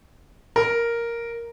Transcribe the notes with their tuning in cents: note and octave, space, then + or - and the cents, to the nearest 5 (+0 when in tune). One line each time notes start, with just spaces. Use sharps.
A#4 +0